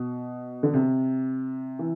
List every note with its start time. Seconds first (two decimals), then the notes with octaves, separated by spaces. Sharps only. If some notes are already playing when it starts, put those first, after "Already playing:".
Already playing: B2
0.63 D3
0.73 C3
1.79 E3